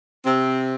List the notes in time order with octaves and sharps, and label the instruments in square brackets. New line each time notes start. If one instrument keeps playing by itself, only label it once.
[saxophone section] C3 C4